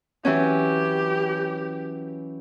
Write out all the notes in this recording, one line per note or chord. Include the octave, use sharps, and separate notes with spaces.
E3 F#3 C#4 G4